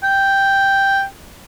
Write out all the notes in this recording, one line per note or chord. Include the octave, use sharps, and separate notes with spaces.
G5